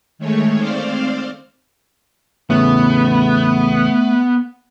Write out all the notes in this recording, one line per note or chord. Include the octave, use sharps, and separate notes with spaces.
D#3 G#3 A3 C#5
C4 C5 D5 F5
E2 A2 C#3 A3 B3